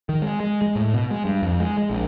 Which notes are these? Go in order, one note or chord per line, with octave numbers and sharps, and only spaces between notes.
D#3
G#3
G#3
G#3
A2
B2
G#3
G2
F2
G#3
G#3
A#1